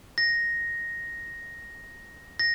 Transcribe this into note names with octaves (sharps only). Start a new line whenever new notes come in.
A#6
A#6